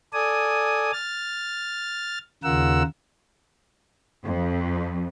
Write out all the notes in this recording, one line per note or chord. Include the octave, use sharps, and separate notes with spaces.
A4 D5 G#5 D#6
F6 A6
D#2 C#3 F4 A#4 F#5 E6
F2